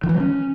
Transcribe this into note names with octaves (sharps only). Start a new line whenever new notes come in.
D#3
E3
G3
C#4